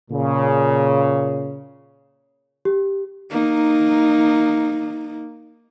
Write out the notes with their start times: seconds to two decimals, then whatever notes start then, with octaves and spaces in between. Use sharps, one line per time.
0.11 A#2 C#3
2.65 G4
3.31 A#3 D#4